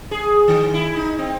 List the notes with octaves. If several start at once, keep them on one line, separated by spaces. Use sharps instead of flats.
G#4
D#3
E4
D#4
C4